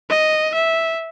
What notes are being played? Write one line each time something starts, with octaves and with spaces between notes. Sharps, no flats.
D#5
E5